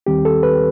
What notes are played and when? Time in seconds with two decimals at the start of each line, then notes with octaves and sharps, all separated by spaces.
0.06 D#2 D#3 G3 C4 G4
0.25 A4
0.43 B4